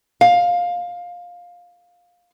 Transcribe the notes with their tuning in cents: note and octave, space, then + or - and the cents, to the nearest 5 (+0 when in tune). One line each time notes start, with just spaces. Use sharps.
F5 +15